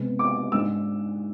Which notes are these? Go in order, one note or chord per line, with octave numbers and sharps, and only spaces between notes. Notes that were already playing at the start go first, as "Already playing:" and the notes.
Already playing: C3 G#3 B3
D6
G#2 G#3 D4 E6